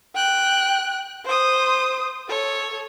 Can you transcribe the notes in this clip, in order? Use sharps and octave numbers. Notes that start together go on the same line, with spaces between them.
G5 F#6
C5 D#6
A4 C#5